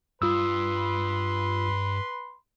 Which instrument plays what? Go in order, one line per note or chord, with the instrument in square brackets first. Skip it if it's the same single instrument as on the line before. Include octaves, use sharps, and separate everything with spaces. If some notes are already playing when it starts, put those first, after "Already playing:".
[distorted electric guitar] G2 [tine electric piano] F4 D#6 E6 [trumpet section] B4 B5 C6